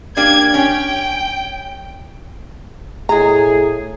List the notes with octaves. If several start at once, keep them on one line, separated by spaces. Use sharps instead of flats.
A#3 D4 G4 G#6
C#4 G5
A2 G#3 G#4 A#5